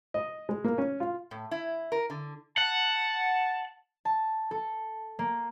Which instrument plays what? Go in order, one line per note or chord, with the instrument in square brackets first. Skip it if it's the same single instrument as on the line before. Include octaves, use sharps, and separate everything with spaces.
[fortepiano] D#5
G#3
A#3
C#4
F4
[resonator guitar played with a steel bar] A2
E4
A#4
D3
[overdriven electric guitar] F#5 [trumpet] A5
[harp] A5
A4
A#3